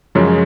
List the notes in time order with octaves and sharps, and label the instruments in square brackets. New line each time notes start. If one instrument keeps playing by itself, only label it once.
[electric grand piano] F#2 C#3 F3 G#3 C#4